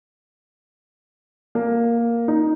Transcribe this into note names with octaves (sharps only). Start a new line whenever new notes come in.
A#3
D#4